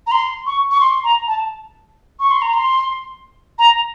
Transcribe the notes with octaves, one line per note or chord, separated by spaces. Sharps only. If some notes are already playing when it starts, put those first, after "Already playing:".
A#5
C6
C#6
C#6
C6
A#5
A5
C#6
C6
A#5
C6
A#5